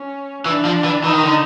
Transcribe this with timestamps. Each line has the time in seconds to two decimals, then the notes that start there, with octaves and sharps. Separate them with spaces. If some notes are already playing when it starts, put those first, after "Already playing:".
Already playing: C#4
0.45 E3 D4
0.65 F3
0.84 E3
1.04 E3 D#4
1.14 D#3
1.24 D3